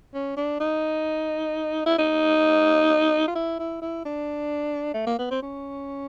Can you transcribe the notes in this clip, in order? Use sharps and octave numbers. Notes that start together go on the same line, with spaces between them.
C#4
D4
D#4
E4
D#4
F4
E4
E4
E4
D4
A3
A#3
B3
C4
C#4